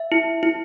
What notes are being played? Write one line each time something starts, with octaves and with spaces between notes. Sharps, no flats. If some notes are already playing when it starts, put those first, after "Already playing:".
Already playing: E5
E4
E4